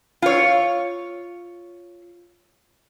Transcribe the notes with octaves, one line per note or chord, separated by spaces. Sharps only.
F4 C#5